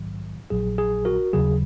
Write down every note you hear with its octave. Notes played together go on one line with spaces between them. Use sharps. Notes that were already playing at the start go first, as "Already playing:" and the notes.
Already playing: A#1 G#2 D#3 F#3
A#1 A#2 F#3 G#4
G#4
F#4 A#4
D#2 C#3 F#3 G#4